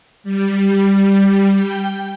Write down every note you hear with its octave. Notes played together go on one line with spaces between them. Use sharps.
G3
G5